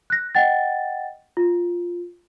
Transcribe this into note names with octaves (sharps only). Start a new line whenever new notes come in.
F#6 A#6
D#5 F#5 G5 A6
F4